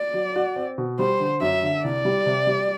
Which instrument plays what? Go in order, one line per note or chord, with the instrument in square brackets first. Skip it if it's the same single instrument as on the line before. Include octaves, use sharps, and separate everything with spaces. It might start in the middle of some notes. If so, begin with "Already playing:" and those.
Already playing: [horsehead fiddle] D5
[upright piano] F#3
F#4
C4
B2
[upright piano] G3 [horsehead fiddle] C5
[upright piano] D3
[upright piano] F#2 [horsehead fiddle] E5
[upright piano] D3
[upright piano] C2 [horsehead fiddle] D5
[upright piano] G3
C3
G3